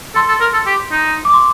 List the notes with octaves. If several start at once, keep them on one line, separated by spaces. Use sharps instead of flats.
A4 C6
A4
A#4
A4
G4
D#4
D6
C6